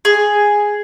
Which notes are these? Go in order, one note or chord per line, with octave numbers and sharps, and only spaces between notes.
G#4